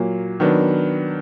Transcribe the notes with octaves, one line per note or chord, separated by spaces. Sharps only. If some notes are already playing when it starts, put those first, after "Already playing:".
Already playing: A#2 F#3 A#3
D#3 F#3 B3 D4